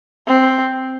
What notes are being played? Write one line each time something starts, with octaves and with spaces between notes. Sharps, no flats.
C4